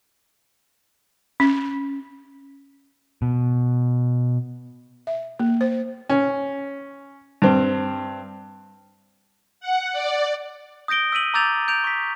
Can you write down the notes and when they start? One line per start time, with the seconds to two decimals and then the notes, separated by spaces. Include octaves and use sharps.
1.40 C#4
3.22 B2
5.07 E5
5.39 A#3
5.61 C5
6.10 C#4
7.42 G2 C4
9.60 F#5
9.93 D5
10.88 D#6 G6 A#6 D7 G7
11.12 E6 B6 D#7 F#7
11.34 A#5 D6 E6 G6 A6 F7
11.68 G6 D7 F7
11.84 C#6 B6